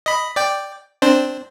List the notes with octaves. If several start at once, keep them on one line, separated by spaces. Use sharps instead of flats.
D#5 B5
D5 G5
C4 D4 C5